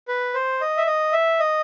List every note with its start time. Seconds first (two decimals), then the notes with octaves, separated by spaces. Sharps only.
0.08 B4
0.34 C5
0.61 D#5
0.77 E5
0.87 D#5
1.13 E5
1.40 D#5